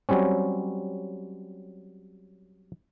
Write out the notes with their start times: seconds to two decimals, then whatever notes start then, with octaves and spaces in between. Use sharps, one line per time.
0.09 F#3 G3 C4 C#4